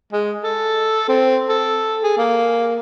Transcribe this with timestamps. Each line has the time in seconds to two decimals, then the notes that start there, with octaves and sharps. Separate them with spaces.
0.12 G#3
0.43 A4
1.08 C4
1.49 A4
2.03 G#4
2.18 A#3